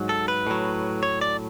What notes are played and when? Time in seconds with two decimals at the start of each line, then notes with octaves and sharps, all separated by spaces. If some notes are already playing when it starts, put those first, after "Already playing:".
Already playing: G#2 F#3
0.09 A4
0.28 B4
0.47 A2 F#3
1.03 C#5
1.21 D5